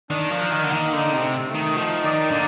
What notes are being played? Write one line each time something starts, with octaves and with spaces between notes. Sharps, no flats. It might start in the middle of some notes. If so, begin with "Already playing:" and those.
D#3 D4
F3
A#4
D#3
D3 A#3
D#3
D3 D#4
C3
A3
A3
D#3
F3 D#4
D#3 D5
D3 A#3